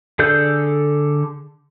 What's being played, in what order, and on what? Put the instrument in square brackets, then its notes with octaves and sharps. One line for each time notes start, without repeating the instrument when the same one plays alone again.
[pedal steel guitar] D3 G#4 A4 D5 G6